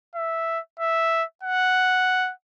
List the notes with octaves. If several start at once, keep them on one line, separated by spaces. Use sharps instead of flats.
E5
E5
F#5